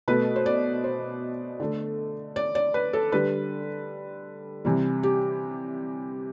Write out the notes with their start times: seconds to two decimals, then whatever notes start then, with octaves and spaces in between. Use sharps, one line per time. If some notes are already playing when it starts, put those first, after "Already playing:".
0.08 B2 A3 B4
0.36 C5
0.46 D5
0.84 C5
1.60 D3 A3
2.36 D5
2.55 D5
2.74 B4
2.93 A4
3.12 D3 G3 B4
4.65 C3 E3 G3
5.03 G4